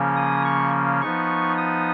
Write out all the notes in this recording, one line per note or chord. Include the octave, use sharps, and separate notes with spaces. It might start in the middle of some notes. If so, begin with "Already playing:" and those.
Already playing: C#3 F3 A#3 C#4
D#6
C#6
F3 B3 D#4 C#6
D#6